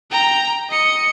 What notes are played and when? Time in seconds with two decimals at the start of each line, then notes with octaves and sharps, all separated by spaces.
0.11 G5 A#5
0.69 D#5 C#7